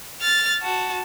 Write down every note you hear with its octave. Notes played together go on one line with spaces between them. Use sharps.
F6 A6
F#4 A5